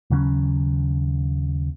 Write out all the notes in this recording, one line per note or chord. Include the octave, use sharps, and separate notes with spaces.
D#2 C#3 F#3 C#4